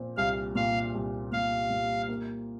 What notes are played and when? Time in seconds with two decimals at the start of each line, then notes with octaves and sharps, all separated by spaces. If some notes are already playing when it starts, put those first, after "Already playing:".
Already playing: A#2 F3 C4
0.17 C2 F5
0.55 A#2 F5
0.94 C2
1.32 A#2 F5
1.70 A#2
2.09 A#3